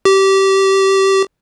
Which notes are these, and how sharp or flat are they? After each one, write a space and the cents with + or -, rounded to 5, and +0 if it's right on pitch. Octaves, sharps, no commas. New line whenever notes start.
G4 -20